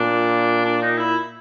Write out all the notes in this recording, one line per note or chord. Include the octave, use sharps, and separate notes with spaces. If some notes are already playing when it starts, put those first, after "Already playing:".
Already playing: A#2 D4
D4
D#4
E4